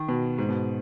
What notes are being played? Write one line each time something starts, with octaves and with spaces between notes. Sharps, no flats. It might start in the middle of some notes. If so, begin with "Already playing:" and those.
Already playing: D#3
B2
G#2
B2